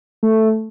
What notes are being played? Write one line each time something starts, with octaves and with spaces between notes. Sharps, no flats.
A3